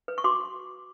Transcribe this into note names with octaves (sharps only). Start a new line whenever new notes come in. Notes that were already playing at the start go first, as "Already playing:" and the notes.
B4
C#6
F#4 C6 D6